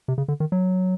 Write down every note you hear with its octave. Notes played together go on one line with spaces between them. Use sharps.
C3
C#3
D3
D#3
F#3